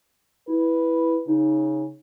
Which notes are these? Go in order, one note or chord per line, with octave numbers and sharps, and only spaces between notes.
E4 B4
C#3 D#4